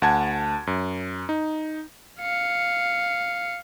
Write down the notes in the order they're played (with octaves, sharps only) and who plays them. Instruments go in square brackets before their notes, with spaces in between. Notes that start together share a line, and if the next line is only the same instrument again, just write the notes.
[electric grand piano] D2 F#5 A5 G#6
F#2
D#4
[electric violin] F5 C#7